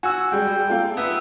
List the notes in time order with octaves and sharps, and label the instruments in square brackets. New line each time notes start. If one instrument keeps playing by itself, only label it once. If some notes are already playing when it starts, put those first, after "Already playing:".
[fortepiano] F#4 [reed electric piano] G#5 E6
[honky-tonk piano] G3 G#3 [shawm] G5
[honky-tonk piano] A#3 F4 A4
[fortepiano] B3 [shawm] E5